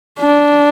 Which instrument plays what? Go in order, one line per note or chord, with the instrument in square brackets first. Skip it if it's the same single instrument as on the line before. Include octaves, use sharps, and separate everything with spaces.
[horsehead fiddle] D4